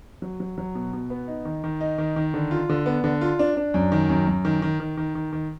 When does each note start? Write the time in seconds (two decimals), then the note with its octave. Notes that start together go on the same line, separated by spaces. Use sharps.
0.22 F#3
0.40 F#3
0.58 F#3
0.75 B2
0.93 B2
1.10 B3
1.28 D#4
1.45 D#3
1.64 D#3
1.81 D#4
1.98 D#3
2.16 D#3
2.34 D3
2.51 F4
2.69 D3
2.86 B3
3.04 D3
3.21 F4
3.39 D4
3.57 D4
3.74 F#2
3.92 D#3
4.09 F#2
4.27 F#2
4.45 D#3
4.62 D#3
4.80 D#3
4.97 D#3
5.15 D#3
5.32 D#3